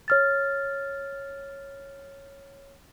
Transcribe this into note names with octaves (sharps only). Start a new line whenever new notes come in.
C#5 F6 A6